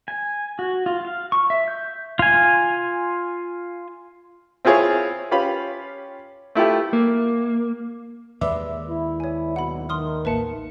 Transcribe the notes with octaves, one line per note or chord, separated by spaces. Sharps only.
G#5
F#4
F4
F5
C#6
E5
G6
F4 G#5
C4 E4 F4 G#4 C#5
C#4 F4 G4 F5 B5
A3 E4 F4 G4
A#3
D#2 G#3 B4 D5 E5 D6
E4
C#5 G#5
B1 F#5 B5
D#3 C6 D#6 F6
A1 A#3 B4 E5 A5 C#7